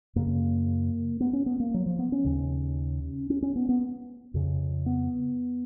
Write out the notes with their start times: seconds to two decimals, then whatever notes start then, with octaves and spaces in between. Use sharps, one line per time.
0.16 F#2 C#3 A#3
1.20 B3
1.33 C#4
1.46 B3
1.60 A#3
1.74 F#3
1.86 F3
1.99 B3
2.12 C#4
2.25 D#2 C#3
3.30 C#4
3.42 C#4
3.56 B3
3.69 B3
4.34 F2 C#3
4.86 B3